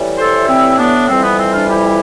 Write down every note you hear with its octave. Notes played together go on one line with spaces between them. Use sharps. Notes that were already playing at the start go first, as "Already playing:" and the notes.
Already playing: A2 E3 G3
A4 C5
C4 E4
B3 D4
F2 E3 G3 C4
B3
C4
D4 F4
E4 G4